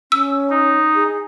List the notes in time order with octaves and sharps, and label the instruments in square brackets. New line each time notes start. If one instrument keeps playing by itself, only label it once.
[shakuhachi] C#4 [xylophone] E6
[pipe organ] D#4
[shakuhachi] G#4